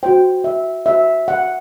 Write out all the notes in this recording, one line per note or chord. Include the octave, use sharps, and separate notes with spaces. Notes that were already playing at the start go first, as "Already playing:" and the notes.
F#4 C5 G5
E5
F#4 C5 E5
F#5